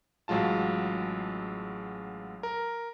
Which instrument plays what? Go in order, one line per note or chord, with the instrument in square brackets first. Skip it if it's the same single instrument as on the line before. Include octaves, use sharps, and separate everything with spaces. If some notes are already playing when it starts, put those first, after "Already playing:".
[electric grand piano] A1 F#3 G#3 F4 A5
A#4